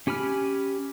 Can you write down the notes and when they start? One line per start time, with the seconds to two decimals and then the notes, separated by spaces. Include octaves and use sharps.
0.07 C#4 G4 G#5 B5 F6